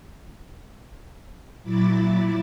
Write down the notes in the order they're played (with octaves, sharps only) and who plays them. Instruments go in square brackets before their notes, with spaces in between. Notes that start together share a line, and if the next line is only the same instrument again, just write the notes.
[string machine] A#2 F#3 E4 B5 D6 A6